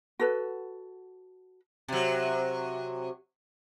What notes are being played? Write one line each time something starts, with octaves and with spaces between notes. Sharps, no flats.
F#4 A4 B4
C3 F#3